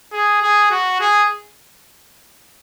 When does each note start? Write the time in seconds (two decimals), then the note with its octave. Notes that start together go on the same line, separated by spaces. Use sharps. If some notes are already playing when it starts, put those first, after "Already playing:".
0.12 G#4
0.42 G#4
0.71 F#4
1.00 G#4